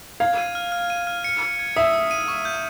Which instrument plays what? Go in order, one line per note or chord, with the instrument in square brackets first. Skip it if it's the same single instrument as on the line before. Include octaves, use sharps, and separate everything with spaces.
[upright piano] F5 [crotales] G#6
[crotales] D#7
F6
F6
D#7
F6
C#7
C#7
G#6
[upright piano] E5 [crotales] D#6
[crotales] D#6
D#7
C#6
G6